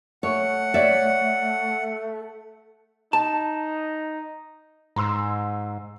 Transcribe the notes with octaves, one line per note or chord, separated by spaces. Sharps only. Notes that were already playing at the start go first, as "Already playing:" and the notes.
A3 C#5 F#5
C#5 D5 E5
D#4 A5
G#2 A#5 C6 E6